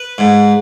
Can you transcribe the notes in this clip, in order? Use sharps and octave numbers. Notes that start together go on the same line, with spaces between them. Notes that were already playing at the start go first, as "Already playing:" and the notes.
Already playing: B4
G#2